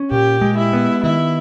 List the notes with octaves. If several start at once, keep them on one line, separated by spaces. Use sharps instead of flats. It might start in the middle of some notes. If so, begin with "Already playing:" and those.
Already playing: C#4
A#2 G4
G#3
E4
B3
D#3 E4